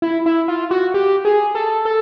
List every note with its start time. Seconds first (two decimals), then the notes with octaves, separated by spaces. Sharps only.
0.02 E4
0.26 E4
0.48 F4
0.71 F#4
0.94 G4
1.25 G#4
1.55 A4
1.85 A4